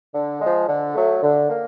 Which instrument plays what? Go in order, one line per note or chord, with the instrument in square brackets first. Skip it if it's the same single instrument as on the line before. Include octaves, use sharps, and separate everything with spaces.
[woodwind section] D3
F3 G#3
D3
F#3 A3
D3
A#3